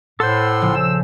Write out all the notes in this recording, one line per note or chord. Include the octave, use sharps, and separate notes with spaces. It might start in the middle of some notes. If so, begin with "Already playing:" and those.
A2 A4 C5 F#5 C6 E6
A#1 C#3 F3
G#4 E6